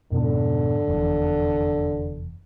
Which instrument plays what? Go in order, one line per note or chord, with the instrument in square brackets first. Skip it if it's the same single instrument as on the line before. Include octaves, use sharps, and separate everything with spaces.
[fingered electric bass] F2 G#2 B2 [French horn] D3
[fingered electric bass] F1 E2